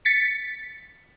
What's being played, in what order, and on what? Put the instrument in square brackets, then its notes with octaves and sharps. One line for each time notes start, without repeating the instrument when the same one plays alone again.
[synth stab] A6 B6 C#7